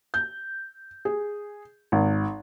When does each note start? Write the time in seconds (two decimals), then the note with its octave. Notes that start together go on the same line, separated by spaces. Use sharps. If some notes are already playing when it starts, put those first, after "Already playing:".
0.14 G6
1.05 G#4
1.92 G#1